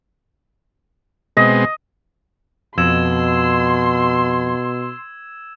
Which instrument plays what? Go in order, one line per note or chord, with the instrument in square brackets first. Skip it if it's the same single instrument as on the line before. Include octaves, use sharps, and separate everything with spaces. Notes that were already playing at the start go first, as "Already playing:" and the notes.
[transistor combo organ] B2 G#3 C4 [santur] D#5
[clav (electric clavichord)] F2 [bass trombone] B2 [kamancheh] C6 [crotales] E6 G#6 E7